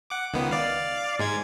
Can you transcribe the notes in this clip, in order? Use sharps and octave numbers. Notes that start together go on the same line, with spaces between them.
F#5 D6
C#2 D#3 B3
D5 F5
G#2 G#3 G#6